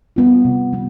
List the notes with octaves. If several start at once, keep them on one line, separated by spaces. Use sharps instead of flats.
G3 B3 F4
C3
G3 B3